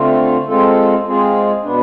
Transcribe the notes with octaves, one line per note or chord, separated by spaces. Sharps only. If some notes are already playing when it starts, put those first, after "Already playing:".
Already playing: D3 A3 C4 F4
G#3 C4 F4 A4
G#3 C4 F4 G#4
B2 B3 D4